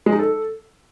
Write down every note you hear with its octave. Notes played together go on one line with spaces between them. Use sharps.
G#3
D#4
A4